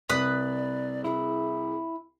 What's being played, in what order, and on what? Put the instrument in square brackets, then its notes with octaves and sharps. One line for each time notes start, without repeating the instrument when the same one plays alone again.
[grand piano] C2 [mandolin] B4 D#6 [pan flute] D5
[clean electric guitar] E4 [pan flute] G#4